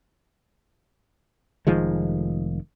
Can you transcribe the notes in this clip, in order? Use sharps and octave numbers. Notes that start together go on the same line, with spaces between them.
F1 D#3 F3 G#3